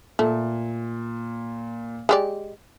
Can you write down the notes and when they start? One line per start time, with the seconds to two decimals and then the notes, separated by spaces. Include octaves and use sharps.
0.19 A#2 A3
2.09 G#3 G4 D5